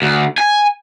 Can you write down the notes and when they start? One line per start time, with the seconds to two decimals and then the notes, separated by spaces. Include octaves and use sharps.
0.02 D2
0.38 G#5